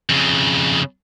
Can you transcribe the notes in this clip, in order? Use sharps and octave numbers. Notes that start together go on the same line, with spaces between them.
F2 C#3